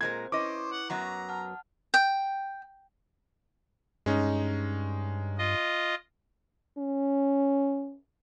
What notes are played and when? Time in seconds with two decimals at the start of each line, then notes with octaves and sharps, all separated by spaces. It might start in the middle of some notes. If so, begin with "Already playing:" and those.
0.01 A#2 G#3 C4 A#4 C5 G#6
0.32 C#4 E4 B4 C5 D#5 C#6 D6
0.72 F#5
0.90 F#2 F#3 B3 F#5 A#5 F#6
1.29 F#5 A5 F6
1.94 G5
4.06 G2 G#3 C#4 D#4
5.38 F4 D#5
6.78 C#4